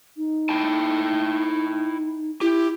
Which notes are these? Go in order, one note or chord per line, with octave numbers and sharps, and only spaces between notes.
D#4
E4 G5 A5
E4 G4